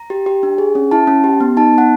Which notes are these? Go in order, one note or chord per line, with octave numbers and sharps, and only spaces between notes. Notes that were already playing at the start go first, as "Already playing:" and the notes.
Already playing: A#5
G4
G4
D4
G#4
C#4
E4 A5
C#4
G4
B3
D#4 A5
B3 F#5